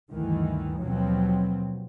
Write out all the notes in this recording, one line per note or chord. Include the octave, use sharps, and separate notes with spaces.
D2 G2 D#3 E3
D#2 B2 F3 F#3 C4